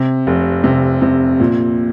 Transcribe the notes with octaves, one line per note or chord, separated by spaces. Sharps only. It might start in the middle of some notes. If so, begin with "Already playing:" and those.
Already playing: C3
F1
C3
C3
A#2